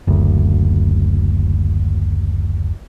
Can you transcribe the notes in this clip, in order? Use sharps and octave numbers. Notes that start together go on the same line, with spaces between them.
F#1 D2